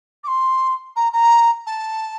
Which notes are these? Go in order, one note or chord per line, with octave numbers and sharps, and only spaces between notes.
D6
C6
A#5
A#5
A5